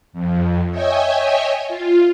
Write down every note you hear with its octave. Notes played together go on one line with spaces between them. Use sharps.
F2
C#5 D#5 E5 G5 G#5
F4